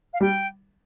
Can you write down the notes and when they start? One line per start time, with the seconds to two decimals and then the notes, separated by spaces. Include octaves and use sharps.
0.13 F5
0.21 G3 G5